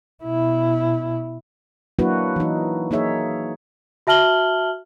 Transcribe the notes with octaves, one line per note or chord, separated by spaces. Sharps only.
B2 E4
F#3 A#3 D4 E4 F#4 B4
E3 D#4
A#3 D#4 G#4 C#5 E5
F#4 E5 A5 F6 F#7 G7